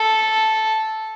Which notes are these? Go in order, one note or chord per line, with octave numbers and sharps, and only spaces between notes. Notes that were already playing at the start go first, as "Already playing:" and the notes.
Already playing: A4